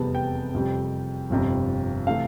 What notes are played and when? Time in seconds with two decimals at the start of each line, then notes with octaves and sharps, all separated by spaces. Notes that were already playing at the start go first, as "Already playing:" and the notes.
Already playing: F1 E2 C3 G3 B3 A5
0.15 G5
0.53 F1 F2 C3 G3
1.30 G1 F2 C3 G3
2.07 C3 E3 A3 F5